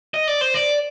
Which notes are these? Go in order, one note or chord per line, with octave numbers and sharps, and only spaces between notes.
D#5
D5
C5
D5